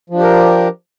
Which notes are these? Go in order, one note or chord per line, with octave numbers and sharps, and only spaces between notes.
F3 D4 G4 A#4